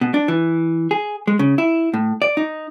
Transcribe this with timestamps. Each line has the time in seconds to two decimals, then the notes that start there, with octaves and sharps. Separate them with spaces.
0.01 B2
0.14 D4
0.28 E3
0.91 G#4
1.27 G#3
1.39 C#3
1.58 E4
1.94 A2
2.22 D5
2.37 D#4